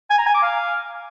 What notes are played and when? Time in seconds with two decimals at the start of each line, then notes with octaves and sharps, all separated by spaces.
0.10 G#5
0.18 A#5
0.26 G#5
0.35 D6
0.43 F5